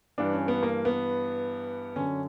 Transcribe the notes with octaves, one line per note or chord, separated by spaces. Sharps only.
G2 E3 D4
C#4
B3
A#3
B3
F#2 D3 C#4